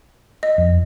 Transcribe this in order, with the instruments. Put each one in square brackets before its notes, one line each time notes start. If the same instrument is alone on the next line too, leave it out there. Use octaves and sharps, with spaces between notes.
[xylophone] D#5
[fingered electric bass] F2